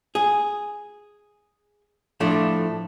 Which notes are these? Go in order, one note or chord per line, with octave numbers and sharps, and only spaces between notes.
G#4
A2 F3 A3 D4